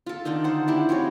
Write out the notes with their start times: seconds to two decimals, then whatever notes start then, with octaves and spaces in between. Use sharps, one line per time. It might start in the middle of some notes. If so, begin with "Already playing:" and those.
0.06 F4 A4
0.25 D3 D#3 D4 D#4
0.44 C5 F#5
0.68 D4 E4 G4
0.89 F3 C4 F#4 C#5